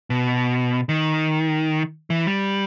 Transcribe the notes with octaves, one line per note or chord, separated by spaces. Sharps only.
B2
D#3
E3
G3